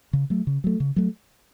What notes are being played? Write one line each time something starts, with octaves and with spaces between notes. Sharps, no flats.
C#3
F#3 A3
C#3
F#3 A3
C#3
F#3 A3